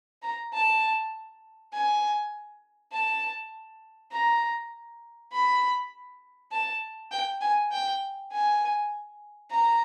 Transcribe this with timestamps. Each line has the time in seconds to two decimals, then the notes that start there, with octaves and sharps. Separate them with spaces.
0.22 A#5
0.53 A5
1.73 G#5
2.92 A5
4.12 A#5
5.32 B5
6.52 A5
7.11 G5
7.41 G#5
7.72 G5
8.32 G#5
9.51 A#5